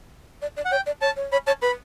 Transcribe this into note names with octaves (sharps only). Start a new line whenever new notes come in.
D5
D5
F#5
C#5 G5
D5
C#5 A5
C#5
C#5 B5
C#5 A5
B4 B5